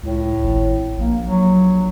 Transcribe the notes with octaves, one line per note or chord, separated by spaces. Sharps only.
C#2 A2
G#1
A#1 A#3
F#3